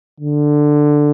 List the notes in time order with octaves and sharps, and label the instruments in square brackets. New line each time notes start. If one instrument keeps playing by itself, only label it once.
[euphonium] D3